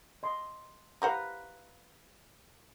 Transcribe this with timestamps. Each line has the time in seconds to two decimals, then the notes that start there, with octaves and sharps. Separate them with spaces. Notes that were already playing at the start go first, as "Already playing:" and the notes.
0.23 D#5 C6
1.02 G4 B4 C5 F5 F#5 A#5